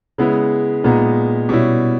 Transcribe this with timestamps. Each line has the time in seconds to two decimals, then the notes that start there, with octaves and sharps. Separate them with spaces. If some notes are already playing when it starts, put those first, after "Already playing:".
0.18 C#3 G#3 B3 E4
0.84 A#2 G#3 B3 D#4
1.49 B2 G3 C#4 E4